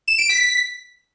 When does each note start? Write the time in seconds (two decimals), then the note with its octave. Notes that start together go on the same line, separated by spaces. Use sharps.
0.08 E7
0.19 D7
0.29 B6